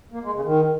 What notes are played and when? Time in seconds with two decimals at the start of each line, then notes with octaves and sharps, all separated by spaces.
0.12 A#3
0.23 G#3
0.34 C#3
0.44 D#3